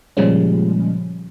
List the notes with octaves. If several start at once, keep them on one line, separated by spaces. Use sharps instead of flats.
A#2 C#3 F3 G3 G#3 C#4